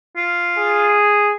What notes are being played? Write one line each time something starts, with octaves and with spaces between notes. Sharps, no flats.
F4
G#4